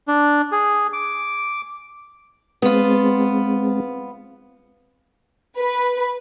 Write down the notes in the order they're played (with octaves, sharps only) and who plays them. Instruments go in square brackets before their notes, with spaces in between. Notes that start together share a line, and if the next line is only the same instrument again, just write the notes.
[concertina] D4
G#4
D6
[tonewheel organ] G#3 C4 [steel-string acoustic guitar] B3 F4
[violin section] B4